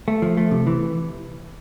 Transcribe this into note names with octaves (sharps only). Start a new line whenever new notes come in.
A3
F3
A3
C3
E3